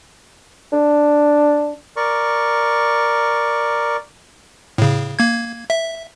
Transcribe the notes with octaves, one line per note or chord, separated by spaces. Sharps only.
D4
A#4 D5 C#6
A2 C#3
A#3 G#6
E5